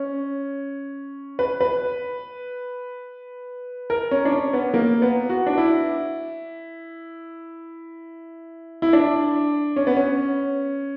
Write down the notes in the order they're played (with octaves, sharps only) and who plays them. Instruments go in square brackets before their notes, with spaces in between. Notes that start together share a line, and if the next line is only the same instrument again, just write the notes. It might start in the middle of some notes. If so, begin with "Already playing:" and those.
Already playing: [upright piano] C#4
B4
B4
A#4
C#4
D4
C#4
B3
A#3
B3
F#4
D4
E4
E4
D4
C#4
B3
C#4